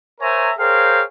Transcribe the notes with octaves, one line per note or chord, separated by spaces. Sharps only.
A#4 C5 C#5 E5 G#5 A#5
G#4 A#4 C5 C#5 F5 G5